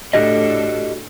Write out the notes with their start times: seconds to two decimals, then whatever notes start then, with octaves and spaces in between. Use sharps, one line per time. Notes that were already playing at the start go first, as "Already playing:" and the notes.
0.13 A2 D4 F#4 G4 A4 D#5